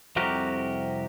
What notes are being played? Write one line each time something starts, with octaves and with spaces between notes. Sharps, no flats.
C2 F2 C3 F#4 G4 A#4